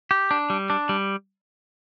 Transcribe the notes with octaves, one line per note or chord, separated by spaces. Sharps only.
G4
D4
G3
D4
G3